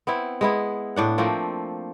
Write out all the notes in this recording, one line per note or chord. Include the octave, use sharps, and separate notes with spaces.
B3 C4 E4
G#3 B3 E4
A2 D4 F#5
F3 A3 A#3 C4